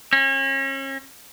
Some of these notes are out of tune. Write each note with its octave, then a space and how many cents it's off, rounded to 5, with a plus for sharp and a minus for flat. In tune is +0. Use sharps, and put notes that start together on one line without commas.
C#4 -35